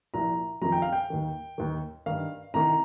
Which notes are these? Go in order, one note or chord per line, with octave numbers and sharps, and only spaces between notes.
C2 A#2 F3 A#5
F2 C3 D#3 A#5
G5
F5
G5
D#2 D#3
D#2 D#3
G2 D#3 F5
C2 C3 D#3 A#5